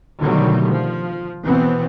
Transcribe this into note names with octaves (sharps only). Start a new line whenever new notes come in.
B2 D3 D#3 F#3 G3 A3
F3
B2 E3 B3 C4